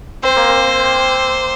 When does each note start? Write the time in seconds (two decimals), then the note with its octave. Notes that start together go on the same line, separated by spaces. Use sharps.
0.23 C4 C5
0.36 A#3
0.49 C4